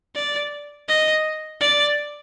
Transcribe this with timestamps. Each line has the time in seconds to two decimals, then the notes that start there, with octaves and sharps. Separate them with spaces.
0.16 D5
0.89 D#5
1.61 D5